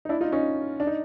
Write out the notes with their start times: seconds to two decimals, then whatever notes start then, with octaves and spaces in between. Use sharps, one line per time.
0.05 D#4
0.09 D4 E4
0.21 D#4 F4
0.32 C#4 D#4
0.80 D4
0.87 D#4